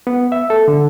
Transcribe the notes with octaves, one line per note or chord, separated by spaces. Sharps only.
B3
E5
A4
D3